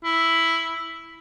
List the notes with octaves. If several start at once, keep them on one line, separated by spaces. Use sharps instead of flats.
E4